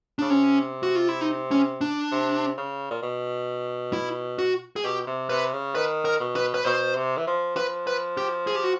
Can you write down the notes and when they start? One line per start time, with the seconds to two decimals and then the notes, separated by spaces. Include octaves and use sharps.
0.19 C#3 D4
0.30 C3 C#4
0.83 F#4
0.95 F4
1.09 E4
1.21 D#4
1.51 C#4
1.81 D4
2.12 C3
2.57 C#3
2.91 A#2
3.02 B2
3.93 E4
4.39 F#4
4.76 G#4
4.84 B2 G4
5.07 C3
5.30 C3 B4
5.53 C#3
5.75 D#3 B4
6.05 A#4
6.20 B2
6.36 B4
6.54 B4
6.65 B2 C5
6.96 C3
7.17 E3
7.27 F3
7.56 F3 B4
7.87 B4
8.17 G4
8.47 G#4
8.56 G4
8.64 F#4